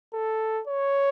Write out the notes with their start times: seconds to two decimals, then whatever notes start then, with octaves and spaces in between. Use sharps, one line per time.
0.14 A4
0.68 C#5